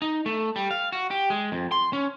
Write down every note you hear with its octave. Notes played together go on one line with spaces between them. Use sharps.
D#4
A3
G3
F5
F#4
G4
G#3
F2
C6
C#4